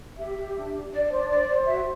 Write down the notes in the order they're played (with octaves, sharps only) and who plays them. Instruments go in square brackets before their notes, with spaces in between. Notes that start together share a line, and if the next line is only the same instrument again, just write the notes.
[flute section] G4 E5
G4
D4
D4
D4 D5
D5
C5
D5
C5 D5
C5
F#4 E5